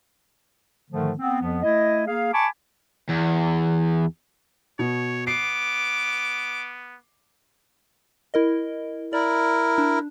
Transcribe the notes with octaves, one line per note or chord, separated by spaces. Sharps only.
G#2 D3 D#3 F3 A3
B3 C4
F2 F3 B3
A3 E4 D#5
A#3 G#4 F5
G#5 A5 B5 C#6 D6
E2
B2 C#5
B3 D6 C7
E4 A#4 D#5
E4 A#4 D5
D4